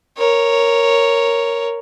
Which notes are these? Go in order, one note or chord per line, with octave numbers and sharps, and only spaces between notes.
A#4 C#5